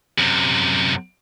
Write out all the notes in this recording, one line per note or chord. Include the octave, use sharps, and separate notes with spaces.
F#2 C3